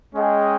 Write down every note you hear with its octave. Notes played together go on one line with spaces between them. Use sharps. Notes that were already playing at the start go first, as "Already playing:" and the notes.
G#3 C#4 G#4 D#5 G5